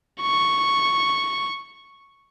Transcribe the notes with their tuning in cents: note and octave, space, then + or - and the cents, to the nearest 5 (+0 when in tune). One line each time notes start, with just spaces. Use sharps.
C#6 -5